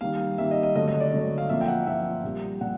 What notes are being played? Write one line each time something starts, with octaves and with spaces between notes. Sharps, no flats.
D#3 G3 A#3 F5
D#3 G3 A#3 E5
D#5
D#5
D3 F#3 A3 D#5
D#5
D5
D3 F#3 A3
F5
A#2 F3 A#3 E5
G5
F#5
A#2 F3 A#3 E5
A#2 G3 A#3
A#2 G3 F#5